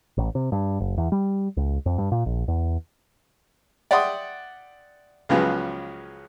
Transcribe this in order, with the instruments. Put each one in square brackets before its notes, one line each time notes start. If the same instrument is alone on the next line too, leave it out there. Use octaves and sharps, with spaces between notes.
[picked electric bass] A1
C3
G2
F#1
E2
G3
C#2
F2
G2
A#2
A#1
E2
[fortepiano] D5 E5 F#5 G5 C6 D#6
C#2 C#3 F3 F#3 G#3 B3